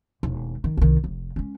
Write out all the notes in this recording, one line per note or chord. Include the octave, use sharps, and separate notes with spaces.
E1 D#2
D#3
C2 D#3
F1
G#3 C#4